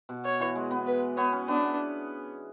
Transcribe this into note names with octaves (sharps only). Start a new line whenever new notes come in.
B2
C#5
E3
G#3
B3
B4
B3 C#5
C#4
B3 D4